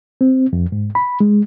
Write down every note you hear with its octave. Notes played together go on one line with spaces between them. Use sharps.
C4
F2
G#2
B5
G#3